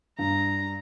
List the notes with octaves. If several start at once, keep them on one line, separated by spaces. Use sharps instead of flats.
G2 A#5